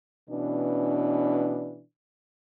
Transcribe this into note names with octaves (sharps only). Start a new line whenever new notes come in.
B2 E3 C#4 D4